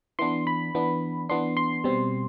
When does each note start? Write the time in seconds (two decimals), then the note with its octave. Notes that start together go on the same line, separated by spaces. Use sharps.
0.19 E3 B3 D4 C6
0.47 B5
0.75 E3 B3 D4
1.29 E3 B3 D4 C6
1.57 C6
1.84 B2 G3 C4